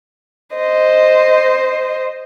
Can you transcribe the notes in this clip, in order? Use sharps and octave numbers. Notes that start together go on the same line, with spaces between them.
C5 D#5